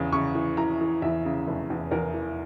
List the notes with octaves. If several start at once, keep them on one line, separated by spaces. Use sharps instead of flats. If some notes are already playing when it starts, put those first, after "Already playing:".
Already playing: E2 C#3 E3
C#3 C#6
E3
E3 A#5
E3
E2 E5
C#3
F1
E2
E2 A#4
E3